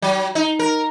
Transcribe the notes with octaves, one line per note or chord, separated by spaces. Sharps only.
F#3
D#4
A#4